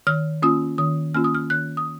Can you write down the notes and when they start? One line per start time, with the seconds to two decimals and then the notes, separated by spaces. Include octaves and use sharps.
0.07 D#3 F6
0.42 A#3 C#4 F4 D#6
0.78 D#3 D#6
1.14 A#3 C#4 F4 F6
1.24 D#6
1.35 F6
1.50 D#3 F#6
1.77 D#6